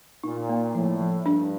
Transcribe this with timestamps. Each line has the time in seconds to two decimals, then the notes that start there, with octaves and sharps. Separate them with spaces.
0.24 A#2 D#4
0.49 A#3
0.75 A2 F3
1.01 F3
1.26 G2 D4